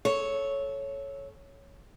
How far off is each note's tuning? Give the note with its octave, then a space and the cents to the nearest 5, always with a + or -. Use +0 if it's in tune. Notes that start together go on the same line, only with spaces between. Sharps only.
A4 -15 C#5 +0